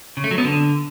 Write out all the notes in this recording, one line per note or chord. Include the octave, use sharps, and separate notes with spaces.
C#3
A3
F#3
B3
D3